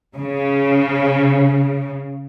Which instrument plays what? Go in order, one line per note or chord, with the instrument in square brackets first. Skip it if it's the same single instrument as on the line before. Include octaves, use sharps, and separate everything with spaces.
[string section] C#3